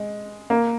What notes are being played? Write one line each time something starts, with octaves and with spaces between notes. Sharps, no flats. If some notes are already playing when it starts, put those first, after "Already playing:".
Already playing: G#3
A#3